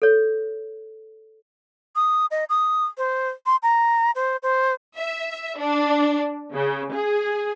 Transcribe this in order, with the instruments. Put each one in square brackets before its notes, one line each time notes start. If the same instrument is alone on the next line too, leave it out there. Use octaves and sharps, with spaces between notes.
[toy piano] A4 C#5
[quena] D#6
D#5
D#6
C5
C6
A#5
C5
C5
[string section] E5
D4
C#3
G#4